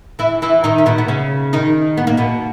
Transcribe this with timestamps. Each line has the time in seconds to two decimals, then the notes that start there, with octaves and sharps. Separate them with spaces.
0.19 E3 E4
0.42 E3 E4
0.64 D#3 D#4
0.78 C#4
0.86 B2 B3
0.98 B3
1.08 C#3 C#4
1.53 D#3 D#4
1.97 B3
2.07 A#3
2.17 B2 B3